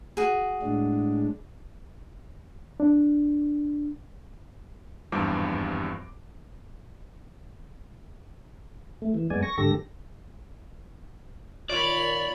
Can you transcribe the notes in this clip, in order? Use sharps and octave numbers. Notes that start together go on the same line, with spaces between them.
F#4 G#4
A2 G#3 D4
D4
G#1 E2 G2 F3 G3 D6
A3
E3
F#2 G#3 B3 D5 G#5
C#6 A#6
G#2 D3 G4 A4 A#6
A#2 D#3 F4 C#5 D5 B5